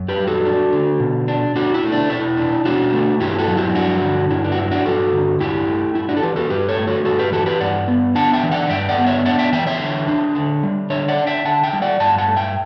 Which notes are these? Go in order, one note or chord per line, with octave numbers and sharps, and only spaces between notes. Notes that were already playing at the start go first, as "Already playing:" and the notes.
Already playing: F#2
G4 B4
G3
F#4 A4
D4
D3
B2
D4
B2 D4 F#4
E4
A3
D4
B2 E4
D4
B2 D4 F#4
A3
G2 E4 G4
F#4 A4
F#3
E4 G4
G2 D4 F#4
D3
G2 E4
D4
F#4
F#3 E4
D4 F#4
G2 F#4 A4
D3
G2 E4 G4
A3
G2 E4
D4 F#4
A4
E3 G4 B4
F#4 A4
G2 G4 B4
A4 C#5
A3
F#4 A4
G2 F#4 A4
G4 B4
E3 F#4 A4
G4 B4
G2 D5 F#5
B3
D4 F#5 A5
E5 G5
E3
D5 F#5
G2 E5 G5
D5 F#5
B3
C#5 E5
D4 D5 F#5
E5 G5
E3 E5 G5
C#5 E5
D3
D4
D3
G3
D3 C#5 E5
D5 F#5
D4
E5 G5
D3 F#5 A5
E5 G5
G3
D5 F#5
G2 F#5 A5
F#5 A5
A3
E5 G5